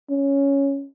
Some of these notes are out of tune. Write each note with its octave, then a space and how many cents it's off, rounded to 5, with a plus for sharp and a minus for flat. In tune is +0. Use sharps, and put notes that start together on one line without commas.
C#4 +0